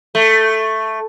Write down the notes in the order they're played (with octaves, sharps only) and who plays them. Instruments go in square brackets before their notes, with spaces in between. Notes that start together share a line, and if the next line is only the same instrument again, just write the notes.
[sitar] A3